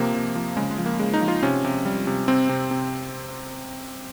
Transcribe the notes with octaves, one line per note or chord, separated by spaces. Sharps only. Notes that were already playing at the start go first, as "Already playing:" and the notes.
Already playing: C3 F3 A#3
C3
F3
C#3 G#3
G#3
F3
A#3
C#3 G#3
D#4
F3
F4
C3 C#4
C3
G3
C3
C3 C4
C3
C3